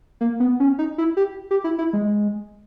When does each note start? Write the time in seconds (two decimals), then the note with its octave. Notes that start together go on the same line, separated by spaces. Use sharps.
0.21 A#3
0.40 B3
0.60 C#4
0.79 D#4
0.98 E4
1.17 G4
1.51 G4
1.64 E4
1.78 E4
1.93 G#3